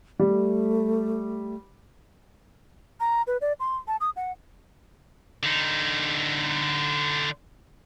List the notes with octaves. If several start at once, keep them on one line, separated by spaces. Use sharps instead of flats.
G3 A3
A#5
B4
D5
C6
A5
D#6
F#5
D3 D#4